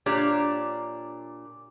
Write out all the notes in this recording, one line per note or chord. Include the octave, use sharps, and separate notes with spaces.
A#2 D4 G4 C#5 D5